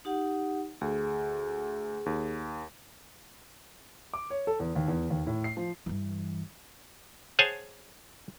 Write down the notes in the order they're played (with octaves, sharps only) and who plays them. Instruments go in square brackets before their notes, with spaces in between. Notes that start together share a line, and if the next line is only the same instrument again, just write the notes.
[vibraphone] D#4 G4 F#5
[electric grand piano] D2 [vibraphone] G#4
[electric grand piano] D#2
[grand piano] D6
C#5
A4
E2
D#2
E2
D#2
A2
C7
F3
[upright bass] G2 E3
[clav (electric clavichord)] G#4 C5 C#5 F#5 G#5 A5